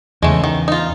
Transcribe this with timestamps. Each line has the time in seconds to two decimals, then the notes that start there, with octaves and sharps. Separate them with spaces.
0.23 E2 C#3 G#3 A3
0.44 D#3
0.68 D#4 F4